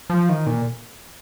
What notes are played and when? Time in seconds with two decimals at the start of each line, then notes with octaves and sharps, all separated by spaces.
0.10 F3
0.29 D#3
0.47 A#2